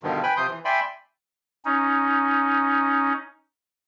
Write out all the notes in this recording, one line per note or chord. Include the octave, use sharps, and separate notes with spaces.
G2 B2 D3 D#3 F3
B4 G5 G#5 B5
C3 F3 C6 D#6 G6
E3
D5 E5 G5 G#5 B5 C6
C#4 D#4